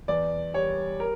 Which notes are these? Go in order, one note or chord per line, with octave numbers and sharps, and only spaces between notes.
E2 D5
G3 C#5
A#4